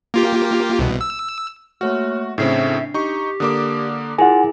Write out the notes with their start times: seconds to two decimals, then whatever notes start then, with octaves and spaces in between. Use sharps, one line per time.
0.14 A#3 F4 G4
0.79 C2 B2
1.01 E6
1.81 A3 A#3 F#4 C#5 F6
2.38 A2 C#3 C4 D4 E5 C7
2.94 D#4 G4 C#6
3.40 D3 A#3 D5 D6 D#6
4.18 E4 F4 G#4 A#4 F#5 G#5